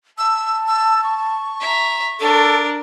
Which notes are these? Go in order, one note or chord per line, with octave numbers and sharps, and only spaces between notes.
A5 E6
E6
C#6
E5 A#5
D4 A4 A#4